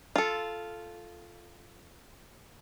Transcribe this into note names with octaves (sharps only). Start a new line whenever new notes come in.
F4 A4